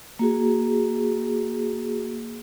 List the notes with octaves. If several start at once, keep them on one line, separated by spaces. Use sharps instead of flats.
A#3 F#4 G#4